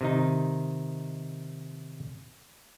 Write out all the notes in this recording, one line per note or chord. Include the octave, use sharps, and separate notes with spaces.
C3 D#3 D#4